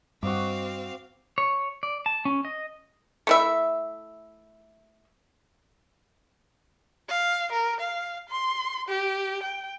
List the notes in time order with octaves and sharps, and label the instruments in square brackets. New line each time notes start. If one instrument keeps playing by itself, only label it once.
[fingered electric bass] G2 [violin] C4 F5 [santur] F#4 D#5 D6
[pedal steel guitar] C#5
D5
A5
C#4
D#5
[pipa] A3 E4 E5
[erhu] F5
A#4
F5
C6
G4
G5